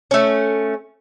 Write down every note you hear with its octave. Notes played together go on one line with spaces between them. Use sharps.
A3 C#4